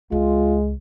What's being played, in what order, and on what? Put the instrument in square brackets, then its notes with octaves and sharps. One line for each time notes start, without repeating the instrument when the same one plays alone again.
[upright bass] C#2 [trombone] G#3 [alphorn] F4